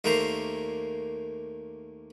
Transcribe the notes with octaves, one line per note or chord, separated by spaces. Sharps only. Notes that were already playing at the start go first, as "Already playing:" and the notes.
D#2 A3 A#3 C5 A#5